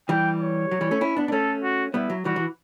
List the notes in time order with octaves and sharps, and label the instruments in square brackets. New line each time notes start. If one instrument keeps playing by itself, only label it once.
[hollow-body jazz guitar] E3 G3 [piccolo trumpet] G5
[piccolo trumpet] C#5
[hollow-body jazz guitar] F#3
E3 G3
A3 C#4
C#4 E4
B3 D4
D4
[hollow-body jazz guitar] A3 C#4 [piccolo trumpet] A4
[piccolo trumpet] F#4
[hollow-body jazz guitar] G3 B3 [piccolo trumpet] E4
[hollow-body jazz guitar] F#3
[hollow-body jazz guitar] E3 G3 [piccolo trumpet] F#4
[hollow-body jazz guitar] E3